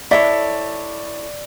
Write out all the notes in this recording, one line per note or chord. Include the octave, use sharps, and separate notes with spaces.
E4 A4 C#5 D5